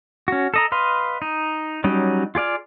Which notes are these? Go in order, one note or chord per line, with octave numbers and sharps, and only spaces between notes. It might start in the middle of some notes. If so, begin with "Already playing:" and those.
C#4 F#4
A4 D#5 A#5
B4 D#5 F5 C6
D#4
F#3 G3 C#4 D#4
F4 G#4 D5 F5